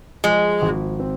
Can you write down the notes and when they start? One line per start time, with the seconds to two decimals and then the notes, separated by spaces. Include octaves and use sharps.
0.24 F3 G#3
0.62 G#1
1.00 C4